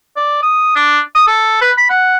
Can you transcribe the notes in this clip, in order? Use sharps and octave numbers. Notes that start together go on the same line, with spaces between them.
D5
D#6
D4
D#6
A4
B4
B5
F#5